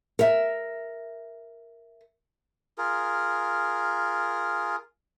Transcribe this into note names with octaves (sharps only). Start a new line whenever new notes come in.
A#4 E5
F4 G#4 A#4